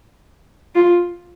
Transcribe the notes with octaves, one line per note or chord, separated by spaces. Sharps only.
F4